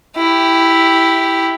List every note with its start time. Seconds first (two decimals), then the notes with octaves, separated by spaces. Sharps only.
0.17 E4 G4